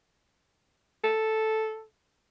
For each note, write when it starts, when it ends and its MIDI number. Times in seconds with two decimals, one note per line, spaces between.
1.04 1.83 69